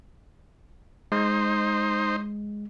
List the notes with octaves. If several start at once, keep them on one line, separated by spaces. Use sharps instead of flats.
G#3 D#4 C5